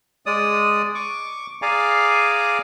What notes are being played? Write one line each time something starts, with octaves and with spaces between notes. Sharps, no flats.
G#3 D5 D#6
C#6 D6
G#4 D5 F5 G#5 A#5 D6